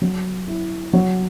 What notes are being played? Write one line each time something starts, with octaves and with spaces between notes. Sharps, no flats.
F#3
E4
F#3